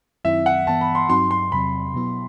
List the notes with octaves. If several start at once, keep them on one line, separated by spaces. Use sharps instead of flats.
F#2 D#3 F#3 C4 E4 E5
F#5
G2 E3 B3 A5
B5
C6
G2 F#3 C4 D#4 F#4 C6
C6
E2 C3 F#3 C4 B5
B2 F#3 B3 E4